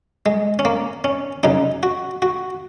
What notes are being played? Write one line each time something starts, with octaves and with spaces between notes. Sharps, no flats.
G#3
C#4
A#3
C#4
F#2 C#3 D#4
F#4
F#4